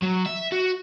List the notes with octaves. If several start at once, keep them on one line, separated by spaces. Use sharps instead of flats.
F#3
E5
F#4